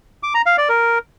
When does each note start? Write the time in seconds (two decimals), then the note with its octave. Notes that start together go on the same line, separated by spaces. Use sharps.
0.23 D6
0.35 A#5
0.46 F5
0.58 D5
0.69 A#4